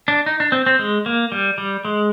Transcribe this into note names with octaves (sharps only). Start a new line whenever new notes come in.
D4
D#4
D4
C4
C4
G#3
A#3
G3
G3
G#3